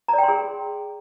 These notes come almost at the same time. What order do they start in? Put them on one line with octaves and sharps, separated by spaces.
A#5 D5 G5 C6 G#4